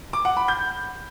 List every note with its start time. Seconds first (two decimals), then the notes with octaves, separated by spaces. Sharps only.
0.13 D6
0.25 F#5
0.37 B5
0.48 G6